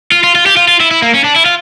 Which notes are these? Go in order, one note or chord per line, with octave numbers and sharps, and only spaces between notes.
F4
F4
F4
G4
F4
F4
E4
E4
A#3
C#4
D4
E4
F4